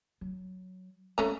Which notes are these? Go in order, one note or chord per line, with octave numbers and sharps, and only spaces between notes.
F#3
G#3 A3 C#4 A#5